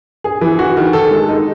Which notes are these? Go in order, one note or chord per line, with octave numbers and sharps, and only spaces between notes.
G#4
E3
F#4
D#3
A4
G#3
D#4